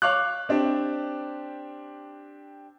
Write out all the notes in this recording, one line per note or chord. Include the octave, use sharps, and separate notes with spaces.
C#5 F5 D6 F#6
C4 D4 G4